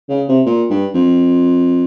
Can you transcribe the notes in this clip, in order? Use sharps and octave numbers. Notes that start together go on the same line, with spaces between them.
C#3
C3
A#2
G2
F2